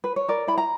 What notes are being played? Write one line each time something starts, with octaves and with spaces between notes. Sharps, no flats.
B4
C#5
A#4 D5
E4 B5
A#5